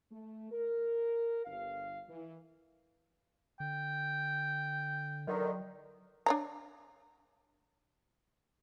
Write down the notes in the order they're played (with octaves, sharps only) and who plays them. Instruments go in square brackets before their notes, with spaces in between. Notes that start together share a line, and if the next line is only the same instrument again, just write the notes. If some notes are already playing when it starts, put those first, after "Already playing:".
[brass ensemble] A3
A#4
G1 F5
E3
[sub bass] D3 [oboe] G5
[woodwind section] E2 D3 D#3 [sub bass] F#3
[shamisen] D4 C#5 A#5